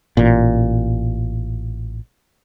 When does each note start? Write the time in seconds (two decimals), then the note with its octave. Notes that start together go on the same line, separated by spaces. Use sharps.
0.17 A1 A#2